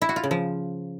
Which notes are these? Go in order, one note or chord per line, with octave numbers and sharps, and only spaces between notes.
E4
F#4
F4
C#3
F3